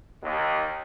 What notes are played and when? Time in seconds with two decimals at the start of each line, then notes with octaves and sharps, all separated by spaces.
0.23 D#2